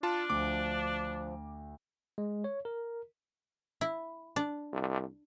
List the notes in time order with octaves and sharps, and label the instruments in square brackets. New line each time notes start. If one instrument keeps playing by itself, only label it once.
[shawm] D4 [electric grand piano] F4 A5
[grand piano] D2 [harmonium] F3 [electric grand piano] D6
[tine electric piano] G#3
C#5
A#4
[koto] E4
D4
[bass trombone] C2